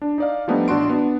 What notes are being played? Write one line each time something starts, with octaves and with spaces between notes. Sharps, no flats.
D4
D#4 D5 F5
F3 G3 A3 B3 D4 D#4
A1 D4 F#4 C6 D7
B3 D4